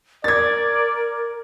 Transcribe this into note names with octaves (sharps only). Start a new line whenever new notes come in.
A#4 D5 G#6 A6